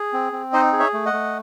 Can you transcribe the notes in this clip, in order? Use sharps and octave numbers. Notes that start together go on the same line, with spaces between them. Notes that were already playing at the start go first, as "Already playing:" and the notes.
Already playing: G#4
C4
C4
D#4 C5 D#5
G#4
C#5 E5
A3
D#5 F#5
A3